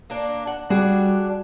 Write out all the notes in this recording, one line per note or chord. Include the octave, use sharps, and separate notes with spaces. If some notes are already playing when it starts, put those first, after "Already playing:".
A#3 D4
F#5
G3 D4 F#4 G#4